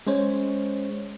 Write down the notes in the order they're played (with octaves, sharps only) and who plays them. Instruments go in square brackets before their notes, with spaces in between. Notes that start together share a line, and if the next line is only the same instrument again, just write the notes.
[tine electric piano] G#3 C#4 C5 C#5